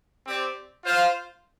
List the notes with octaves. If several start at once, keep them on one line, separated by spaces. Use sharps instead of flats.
C4 G4 D5
F4 C5 F5